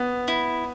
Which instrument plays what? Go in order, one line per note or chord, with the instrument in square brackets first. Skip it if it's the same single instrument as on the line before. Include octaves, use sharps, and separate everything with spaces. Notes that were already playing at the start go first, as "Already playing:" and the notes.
Already playing: [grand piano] B3
[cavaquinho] E4